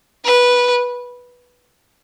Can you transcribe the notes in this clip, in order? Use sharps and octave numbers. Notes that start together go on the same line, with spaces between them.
B4